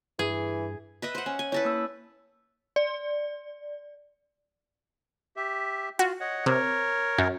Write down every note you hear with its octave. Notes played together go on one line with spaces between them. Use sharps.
G2 E3 G#4
B4 D#5 E5
C5 F#5
C#4
G#5
E4 A4 B4 C#5
A#3 E6
D5
G4 E5
F4 F#4
C#5 D#5 F#5
C3 A#4 C#5
F#2